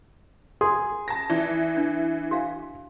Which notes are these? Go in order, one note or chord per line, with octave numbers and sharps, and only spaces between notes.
G#4 C6
A5 A#6
E3 D#4 D5
D4
F#4 F5 G#5